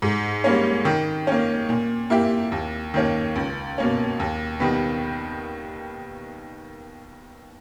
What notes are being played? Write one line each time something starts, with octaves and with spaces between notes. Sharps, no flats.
G#2
G3 A#3 C#4
D#3
A#3 C#4
A#2
A#3 E4 G4
D#2
D#3 A#3 C#4
C#2
B2 A#3 C#4
D#2
D#3 G3 B3